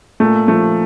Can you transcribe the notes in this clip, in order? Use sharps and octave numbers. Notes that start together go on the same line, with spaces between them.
A#2 A3
F3 A3